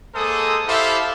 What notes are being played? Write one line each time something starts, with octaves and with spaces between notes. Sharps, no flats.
G#3 A#3 A4 C5 D#6
E4 G4 A4 C5 E5 F5